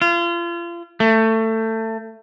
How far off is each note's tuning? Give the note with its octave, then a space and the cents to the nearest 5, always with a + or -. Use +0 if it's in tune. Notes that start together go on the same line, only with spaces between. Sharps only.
F4 -35
A3 +20